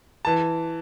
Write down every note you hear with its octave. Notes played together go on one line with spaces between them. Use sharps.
E3 A5